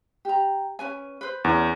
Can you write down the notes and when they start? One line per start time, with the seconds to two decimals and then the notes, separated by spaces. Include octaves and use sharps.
0.25 G4 A#5
0.79 C#4 B4 G#5
1.21 B4 C5
1.44 E2 C#4 D4